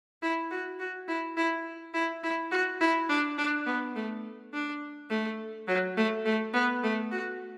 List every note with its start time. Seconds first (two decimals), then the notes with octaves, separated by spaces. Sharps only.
0.22 E4
0.51 F#4
0.79 F#4
1.08 E4
1.37 E4
1.94 E4
2.23 E4
2.51 F#4
2.81 E4
3.09 D4
3.38 D4
3.66 B3
3.96 A3
4.53 D4
5.10 A3
5.68 F#3
5.97 A3
6.25 A3
6.54 B3
6.83 A3
7.11 F#4